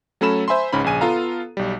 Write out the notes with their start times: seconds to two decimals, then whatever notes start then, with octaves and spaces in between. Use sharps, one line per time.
0.21 F#3 A3 C#4 A4 B5 E7
0.48 C5 E5 G#5 B5 C6
0.73 C#2 G#2 C#4 B5
0.84 A#1 C#3 G#5 D#7
1.01 B3 F4 A4 F5 A#5
1.57 B1 G3